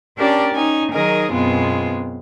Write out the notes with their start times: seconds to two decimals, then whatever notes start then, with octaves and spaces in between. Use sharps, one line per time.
0.17 C#4 D4 G4 A#4 D5 A5
0.53 C#4 D#4 G#5
0.92 D#3 F#3 D#4 G#4 A#4 D#5
1.32 F#2 B2 G#3 B3 C4 F4